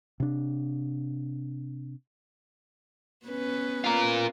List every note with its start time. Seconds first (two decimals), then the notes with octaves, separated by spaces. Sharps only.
0.20 C3 D4
3.26 B3 C#4 B4
3.84 F4 A#4